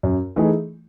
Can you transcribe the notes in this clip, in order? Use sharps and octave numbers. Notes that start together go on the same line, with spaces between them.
F#2
E3 A3 D#4 G#4